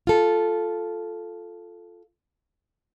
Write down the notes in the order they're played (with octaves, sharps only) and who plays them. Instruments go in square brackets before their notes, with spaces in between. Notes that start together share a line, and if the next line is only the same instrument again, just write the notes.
[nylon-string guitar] F4 A4